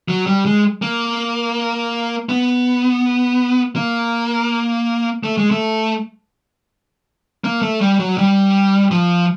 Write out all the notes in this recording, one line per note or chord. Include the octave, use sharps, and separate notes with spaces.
F#3
G3
G#3
A#3
B3
A#3
A3
G#3
A3
A#3
A3
G3
F#3
G3
F3